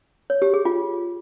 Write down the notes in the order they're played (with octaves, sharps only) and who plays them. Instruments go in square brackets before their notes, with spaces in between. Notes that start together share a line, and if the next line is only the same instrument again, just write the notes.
[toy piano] C#5
G4
G#4
F4